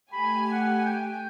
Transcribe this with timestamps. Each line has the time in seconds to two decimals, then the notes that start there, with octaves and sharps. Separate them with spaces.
0.12 A3 G4 G#5 B5
0.51 F#5
0.84 G5